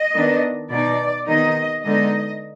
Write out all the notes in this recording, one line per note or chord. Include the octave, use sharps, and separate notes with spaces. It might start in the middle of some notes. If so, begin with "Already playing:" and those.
Already playing: D#5
D#3 B3 D4
B2 B3 D#4 D5
C3 D#3 B3 D#4 D#5
D3 G#3 B3 D#4 D#5